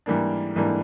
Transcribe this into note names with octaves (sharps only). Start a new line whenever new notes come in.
G#2 E3 G3 A#3 D4
G#2 E3 G3 A#3 D4